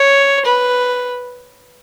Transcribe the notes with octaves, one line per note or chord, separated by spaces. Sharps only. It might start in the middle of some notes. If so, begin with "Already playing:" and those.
Already playing: C#5
B4